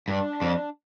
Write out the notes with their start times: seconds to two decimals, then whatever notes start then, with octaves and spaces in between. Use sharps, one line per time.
0.08 G2 D4
0.42 F2